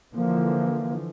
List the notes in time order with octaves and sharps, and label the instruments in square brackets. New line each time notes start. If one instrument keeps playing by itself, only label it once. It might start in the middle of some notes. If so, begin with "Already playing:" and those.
[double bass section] D3 E3 F3 [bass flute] A#3